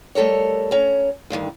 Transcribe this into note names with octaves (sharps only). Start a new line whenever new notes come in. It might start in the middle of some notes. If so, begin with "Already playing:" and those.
G3 A3 A4 A#4 C#5
C#4 A#5
D2 G2 D3 D#3